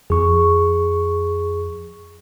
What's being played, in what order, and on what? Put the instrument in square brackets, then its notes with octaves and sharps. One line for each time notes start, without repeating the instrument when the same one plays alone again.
[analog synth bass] F2 [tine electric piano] G#4 C#6